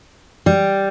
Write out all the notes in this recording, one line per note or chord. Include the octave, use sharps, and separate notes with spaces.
G3